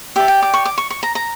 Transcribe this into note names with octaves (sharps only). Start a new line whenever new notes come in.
G4 D5 E5
G5
D6
C#6
D6
C#6
C#6
A#5
A#5